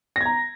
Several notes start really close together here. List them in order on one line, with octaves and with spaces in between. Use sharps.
A#6 G#6 A#5